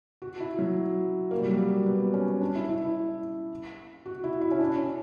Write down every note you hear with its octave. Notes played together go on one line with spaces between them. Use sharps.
F#4
E4
F#3
A#3
G3
F#3
G3
B3
C#4
D4
E4
E4
E4
F#4
E4
E4
C#4
D4
C#4